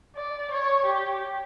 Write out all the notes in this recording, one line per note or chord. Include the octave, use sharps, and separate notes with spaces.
D5
C#5
G4